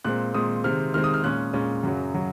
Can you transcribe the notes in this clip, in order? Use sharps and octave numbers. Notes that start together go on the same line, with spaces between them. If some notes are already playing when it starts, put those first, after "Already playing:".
A#2 G#3 C4 F#6
A#2 G#3 C4 D#6
C3 D#3 G#3 C4 F6
C3 D#3 G#3 C4 F6
D#6
F6
A#2 G#3 C#4 F#6
A#2 G#3 C#4
F#2 C#3 F#3
C#3 F#3